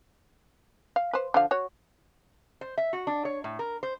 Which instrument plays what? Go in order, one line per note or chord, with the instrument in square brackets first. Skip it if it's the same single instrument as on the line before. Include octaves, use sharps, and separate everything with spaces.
[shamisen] F5
B4 C5
D3 F3 F5
F#4 C#5
[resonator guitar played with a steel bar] C5
E5
F#4
D4
C#5
A2
A#4
C5